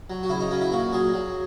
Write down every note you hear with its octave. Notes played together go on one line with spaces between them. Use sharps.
F#3
F#4
C#3 E4
D#4
F#3 C#4
E4
A#2 F#4
F#3 G#4
F#3